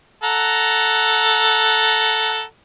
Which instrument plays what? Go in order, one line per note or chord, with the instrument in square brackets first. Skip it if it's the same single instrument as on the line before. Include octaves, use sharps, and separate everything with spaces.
[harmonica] A4 F#5 A#5